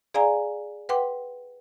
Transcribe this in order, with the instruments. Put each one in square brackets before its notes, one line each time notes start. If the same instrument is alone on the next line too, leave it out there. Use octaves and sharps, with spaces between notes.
[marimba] G#4 D5 F5 G#5 A#5
B4 F#5 G5 C6 D6